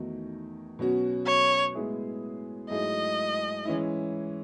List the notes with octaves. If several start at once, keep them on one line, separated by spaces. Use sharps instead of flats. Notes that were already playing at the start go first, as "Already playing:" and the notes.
Already playing: E2 D#3 A3 D#4 F#4
B2 F#3 C#4 F#4
C#5
A2 G#3 B3 E4 G#4
G#2 F#3 A3 E4 G#4 D#5
E3 G#3 C#4 E4